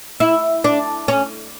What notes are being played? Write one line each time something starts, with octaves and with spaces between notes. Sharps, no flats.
E4
D4
C#4